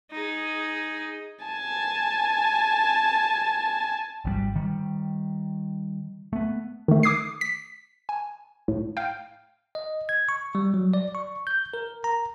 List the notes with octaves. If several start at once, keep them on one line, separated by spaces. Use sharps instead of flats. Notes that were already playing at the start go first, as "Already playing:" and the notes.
D#4 G#4
G#5 A5
G#1 D#3 G3
D#3 G3
A3 B3
D#3 A3
D6 D#6 G#6 C7
B6
G#5
A2
F5 G5
D#5
G#6
C#6
G3
F#3
D5
C#6
G6
A#4
A#5